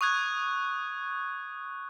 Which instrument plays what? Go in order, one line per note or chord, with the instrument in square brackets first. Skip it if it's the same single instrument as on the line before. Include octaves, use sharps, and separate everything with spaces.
[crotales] C#6 D#6 F#6 G#6